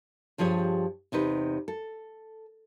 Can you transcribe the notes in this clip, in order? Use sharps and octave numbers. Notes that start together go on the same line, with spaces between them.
G2 F3 G4 G#4 C#5
E2 C3 D#4 B4
A4